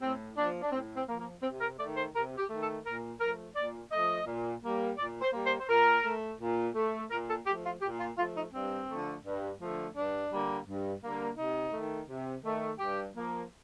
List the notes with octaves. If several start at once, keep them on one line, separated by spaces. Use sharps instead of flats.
A2 C4
F3 A#3 D4
D4
A2 C4
C4
F3 A#3
A#3
C3 C4
A#4
D#3 A3 D5
C5
C3 A#4
G4
D#3 A3
A4
A#2 A#4
F3 A3 A#4
A#2 D5
F3 A3 D#5
A#2
G3 A#3
A#2 D5
C5
G3 A#3
C5
C5
A#2 A#4
A3
A#2
A3
A#2 A#4
A4
F3 A3 G4
F4
A#2 G4
F4
F3 A3 F4
D#4
G2 C4
D3 F3 A3
G2
D3 F3 A3
G2 D4
D3 G3 A#3
G2
D3 G3 A#3
C3 D#4
D#3 A3
C3
D#3 A3
G2 G4
F3 A#3